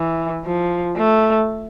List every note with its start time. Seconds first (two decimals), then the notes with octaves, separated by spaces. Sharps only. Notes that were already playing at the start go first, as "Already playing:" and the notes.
Already playing: E3
0.45 F3
0.97 A3